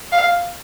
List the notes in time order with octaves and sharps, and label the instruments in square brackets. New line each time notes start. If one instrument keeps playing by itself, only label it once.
[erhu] F5